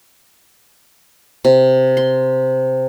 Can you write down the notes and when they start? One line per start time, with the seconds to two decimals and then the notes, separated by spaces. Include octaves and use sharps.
1.45 C3
1.97 C6